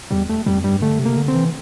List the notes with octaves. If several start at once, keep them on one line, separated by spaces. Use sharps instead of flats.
E2 G3
A3
F2 G3
G2 G3
D3 A3
C3
A#3
D3
C4
E3